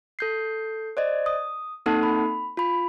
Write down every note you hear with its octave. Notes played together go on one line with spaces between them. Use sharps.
A4 G6 C7
C5 D5 D#5
D#6
A#3 C4 D#4 A4 F#5 A5
B5
F4 B5